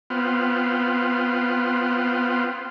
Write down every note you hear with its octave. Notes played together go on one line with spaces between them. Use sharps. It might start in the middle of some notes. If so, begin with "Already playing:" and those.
B3 C4 F4